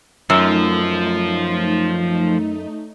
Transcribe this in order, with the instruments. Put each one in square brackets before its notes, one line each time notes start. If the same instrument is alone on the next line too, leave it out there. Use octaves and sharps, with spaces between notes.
[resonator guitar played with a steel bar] F#2 [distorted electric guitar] F3 [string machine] A3 D#4